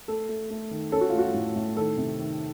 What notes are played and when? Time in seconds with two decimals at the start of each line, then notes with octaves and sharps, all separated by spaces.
0.08 A3 A4
0.29 A3
0.50 A3
0.71 D#3
0.92 C#4 A4
1.01 F#4
1.10 F4
1.13 A3 F#4
1.34 A2
1.56 A2
1.77 D#3 A4
1.97 C3
2.19 D#3